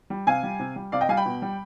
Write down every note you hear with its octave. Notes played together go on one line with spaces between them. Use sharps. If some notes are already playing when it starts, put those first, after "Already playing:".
G3
C3 F5 G#5
G3
C3
G3
C3 D5 F5
D#5 G5
G3 F5 G#5
G5 B5
B2
G3